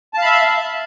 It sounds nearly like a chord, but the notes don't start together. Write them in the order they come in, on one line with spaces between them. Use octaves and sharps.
A5 F5 B5 E5